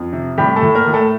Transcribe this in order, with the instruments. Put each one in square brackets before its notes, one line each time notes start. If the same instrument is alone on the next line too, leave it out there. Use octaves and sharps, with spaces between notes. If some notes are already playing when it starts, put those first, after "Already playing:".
Already playing: [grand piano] F2
C3
A2 G3 G4
A3 A4
A2
A#3 A#4
A2
A3 A4